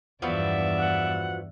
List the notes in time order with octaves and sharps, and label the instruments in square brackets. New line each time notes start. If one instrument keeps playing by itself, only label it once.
[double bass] E2 G2 [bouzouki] F3 F#3 B3 [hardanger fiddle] D5 E5
[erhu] F#5